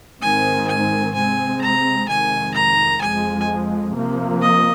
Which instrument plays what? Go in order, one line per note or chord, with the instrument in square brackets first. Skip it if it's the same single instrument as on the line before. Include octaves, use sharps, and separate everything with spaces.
[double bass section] G#2 D#3 G#3 C4 [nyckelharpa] G#5
[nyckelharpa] G#5
[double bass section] C3 G#3 C4 [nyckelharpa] G#5
[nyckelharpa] A#5
[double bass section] F2 C3 D#3 G#3 [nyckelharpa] G#5
[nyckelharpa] A#5
[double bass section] F2 F3 G#3 [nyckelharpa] G#5
[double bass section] C3 F3 A#3
[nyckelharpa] D#5